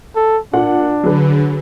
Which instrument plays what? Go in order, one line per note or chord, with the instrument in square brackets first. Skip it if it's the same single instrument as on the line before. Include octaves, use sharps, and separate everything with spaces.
[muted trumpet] A4
[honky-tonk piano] A#2 F#5 [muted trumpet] D4
[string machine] D3 [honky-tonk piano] F#3 G#4 B4